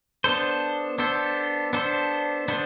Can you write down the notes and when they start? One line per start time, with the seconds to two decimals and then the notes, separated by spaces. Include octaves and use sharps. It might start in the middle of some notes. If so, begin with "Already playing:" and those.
0.24 B3 D4 A4 C5
0.98 B3 D4 A4 C5
1.73 B3 D4 A4 C5
2.48 B3 D4 A4 C5